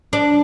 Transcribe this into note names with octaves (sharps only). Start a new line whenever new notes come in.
D4